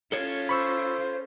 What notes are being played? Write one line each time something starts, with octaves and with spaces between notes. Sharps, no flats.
C#4 F4 A4 C#5
C5 B5 C#6 E6